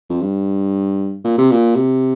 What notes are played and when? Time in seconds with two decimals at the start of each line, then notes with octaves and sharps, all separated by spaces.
0.09 F2
0.21 G2
1.24 A#2
1.38 C3
1.51 A#2
1.75 C3